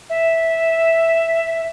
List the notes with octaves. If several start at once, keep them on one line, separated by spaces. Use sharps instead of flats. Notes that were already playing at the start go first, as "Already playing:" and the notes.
E5